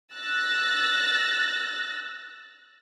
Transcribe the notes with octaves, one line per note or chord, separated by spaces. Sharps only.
E6 F#6 A6 A#6